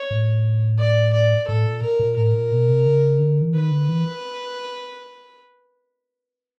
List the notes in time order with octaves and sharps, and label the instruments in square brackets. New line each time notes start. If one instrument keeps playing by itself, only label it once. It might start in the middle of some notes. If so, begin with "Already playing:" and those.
Already playing: [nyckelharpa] C#5
[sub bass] A2
[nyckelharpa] D5
D5
[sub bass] A2 [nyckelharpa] A4
[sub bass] A#2
[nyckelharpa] A#4
[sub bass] A#2
[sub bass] A2 [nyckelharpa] A#4
[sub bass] A#2
B2
C3
C#3
D3
E3
[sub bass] D#3 [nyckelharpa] B4
[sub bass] D3
E3